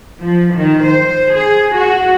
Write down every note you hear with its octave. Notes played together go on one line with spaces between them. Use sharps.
F3
D#3
C5
G#4
F#4